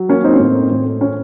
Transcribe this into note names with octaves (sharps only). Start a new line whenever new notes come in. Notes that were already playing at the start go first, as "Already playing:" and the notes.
Already playing: F#3
A#3 C#4
C4 D#4
C#4
A2 C4
A2
C#4